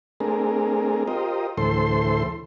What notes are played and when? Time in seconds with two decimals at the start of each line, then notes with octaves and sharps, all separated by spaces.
0.20 A3 C4 D4 G#4 A#4
1.08 F4 G4 A#4 C5 D#5
1.58 D2 A2 E3 A4 C5 C6